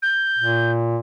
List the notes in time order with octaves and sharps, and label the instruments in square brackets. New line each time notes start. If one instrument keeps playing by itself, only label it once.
[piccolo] G6
[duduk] A#2